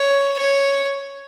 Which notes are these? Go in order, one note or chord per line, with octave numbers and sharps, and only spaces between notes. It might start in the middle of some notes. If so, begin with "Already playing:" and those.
Already playing: C#5
C#5